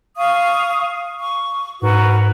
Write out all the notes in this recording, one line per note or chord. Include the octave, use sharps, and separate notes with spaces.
F5 C#6 D#6
C#6
G#2 F#4 A#4 B4